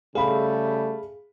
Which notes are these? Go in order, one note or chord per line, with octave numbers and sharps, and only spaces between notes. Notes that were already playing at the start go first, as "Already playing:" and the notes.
C#3 G3 A3 G#4 F5 B5